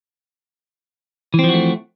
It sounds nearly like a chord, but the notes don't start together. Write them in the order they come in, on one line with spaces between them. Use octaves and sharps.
E3 C4 F3 F#4 A3